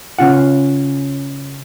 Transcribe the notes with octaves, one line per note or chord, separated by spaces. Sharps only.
C#3 C#4 F4 F#5